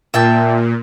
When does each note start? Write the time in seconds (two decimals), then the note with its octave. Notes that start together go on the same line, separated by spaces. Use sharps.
0.14 A#2 E5 G5 A5